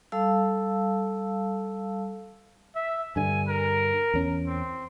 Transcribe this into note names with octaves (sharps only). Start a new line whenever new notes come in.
G3 A4 F5 A5 E6
E5
G2 D3 G#5
A#4
E2 C#4
C4